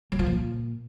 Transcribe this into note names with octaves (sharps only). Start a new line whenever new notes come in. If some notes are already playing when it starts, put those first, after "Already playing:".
F#3
F3
A#2